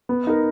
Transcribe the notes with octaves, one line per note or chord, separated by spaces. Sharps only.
B3
D#4 A#4